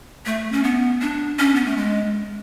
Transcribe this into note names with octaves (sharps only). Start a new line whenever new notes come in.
A3
C#4
B3
D4
C#4
B3
A3
G#3